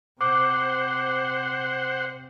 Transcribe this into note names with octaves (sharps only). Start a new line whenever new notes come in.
C3 C5 F#5 D6